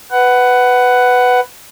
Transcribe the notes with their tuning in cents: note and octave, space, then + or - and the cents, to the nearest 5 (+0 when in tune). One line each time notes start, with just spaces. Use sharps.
B4 +10 F#5 +10